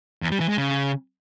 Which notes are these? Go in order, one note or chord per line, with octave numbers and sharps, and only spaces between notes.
E2
G3
E3
G#3
C#3